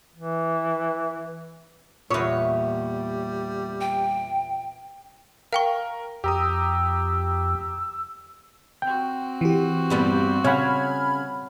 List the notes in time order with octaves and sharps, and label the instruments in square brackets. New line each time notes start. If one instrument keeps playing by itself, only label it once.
[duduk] E3
[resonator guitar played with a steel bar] E2 C#5 [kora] A#2 B3 E5 [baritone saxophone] G3
[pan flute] G5
[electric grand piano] A#4 [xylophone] F5 G5 C#6
[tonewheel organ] F2 [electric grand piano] G4 A#5 D#6 [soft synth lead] E6
[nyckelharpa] C4 F#4 [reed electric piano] G5
[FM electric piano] E3 G4
[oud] G2 G3 B3
[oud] C#3 [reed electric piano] C#5 F#5 [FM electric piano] B5 F6 G#6